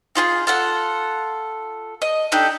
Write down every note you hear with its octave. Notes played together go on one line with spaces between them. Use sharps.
D#4 F4 G4 G#4
F4 A4 F#5
D#5
D4 D#4 G4 A4